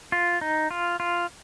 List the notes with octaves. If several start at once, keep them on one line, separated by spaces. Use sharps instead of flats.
F4
D#4
F4
F4